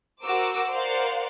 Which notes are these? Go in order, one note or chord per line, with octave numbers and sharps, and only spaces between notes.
F#4 A#4 C5 D6 E6
A#4 C5 D5 F5 F#5